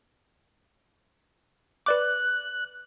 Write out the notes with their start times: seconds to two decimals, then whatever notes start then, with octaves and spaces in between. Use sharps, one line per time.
1.86 B4 D5 D6 F#6